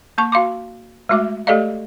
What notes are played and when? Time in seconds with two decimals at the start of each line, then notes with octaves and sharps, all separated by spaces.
0.18 A#3 A5 C#6
0.32 F#4 F5 C6 D6
1.09 G#3 A3 F#4 E5 D6
1.47 A3 G4 A4 D5 D#5 F5